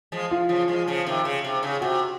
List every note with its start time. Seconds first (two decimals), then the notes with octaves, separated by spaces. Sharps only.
0.12 F3 G#3
0.31 F4
0.49 C#3 F3
0.68 F3 G#3
0.87 C#3 F3
1.07 C3 D#3
1.25 C#3
1.44 C3
1.63 C#3
1.81 C3 F#4